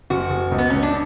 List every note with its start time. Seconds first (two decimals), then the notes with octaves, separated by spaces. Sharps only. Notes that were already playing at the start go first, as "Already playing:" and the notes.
0.10 F#1 F#4
0.30 F#1
0.51 C#2
0.58 B3
0.70 C#2 C#4
0.83 D4